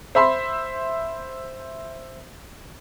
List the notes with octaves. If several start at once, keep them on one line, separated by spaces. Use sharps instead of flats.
C5 E5 B5 C6